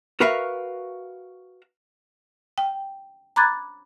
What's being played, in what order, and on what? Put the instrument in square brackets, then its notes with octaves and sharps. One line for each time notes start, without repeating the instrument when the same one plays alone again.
[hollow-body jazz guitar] F#4 A#4 B4 E5 F5
[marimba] G5
A#5 B5 D6 F#6 G#6 A6